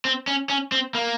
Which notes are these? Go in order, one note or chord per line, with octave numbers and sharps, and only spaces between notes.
C4
C#4
C#4
C4
A#3